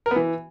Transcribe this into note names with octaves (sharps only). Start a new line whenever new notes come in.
A#4
B3
E3